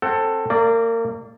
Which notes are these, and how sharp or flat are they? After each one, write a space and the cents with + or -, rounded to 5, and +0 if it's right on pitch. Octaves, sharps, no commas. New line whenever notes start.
C4 +25 A4 +15 F#5 +35
A#3 -30 D5 +0